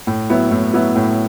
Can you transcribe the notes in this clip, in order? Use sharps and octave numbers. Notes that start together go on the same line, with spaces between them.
A2
F#3 B3 E4
A2
F#3 B3 E4
A2